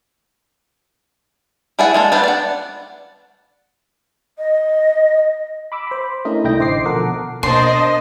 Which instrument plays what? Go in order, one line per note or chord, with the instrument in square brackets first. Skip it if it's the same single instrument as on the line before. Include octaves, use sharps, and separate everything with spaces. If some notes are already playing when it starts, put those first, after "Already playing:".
[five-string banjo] E4 G#4 D5 E5 F#5
G#3 A#3 A4
G3 A3 B3 D4
D5 F#5
[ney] D#5
[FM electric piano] B5 D6 E6
C5 B5
A3 C#4 D4 E4 A#4 D#5
C2 A3 D#4 E4 G5 A#6
A1 D3 C5 D#5 D6 C7
B2 F3 A4 A#4 F#5 D6
[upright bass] B2 [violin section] A#3 D4 C5 [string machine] D#5 [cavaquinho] C6